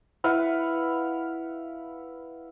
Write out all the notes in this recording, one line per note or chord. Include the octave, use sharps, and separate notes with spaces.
E4 B4 F5 F#5